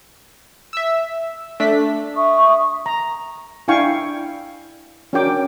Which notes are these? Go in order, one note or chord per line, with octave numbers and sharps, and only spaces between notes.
E5 E6
A3 D4 B6
E5 C#6 D#6
A#5
D4 E4 F5 G5 G#5 C#6
C#4 D4 F#4 A#4 G5 D6